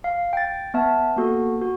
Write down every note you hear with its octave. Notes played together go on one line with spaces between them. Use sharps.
F5
G5 A6
B3 E5 A5
A#3 B3 F#4 A4
F#4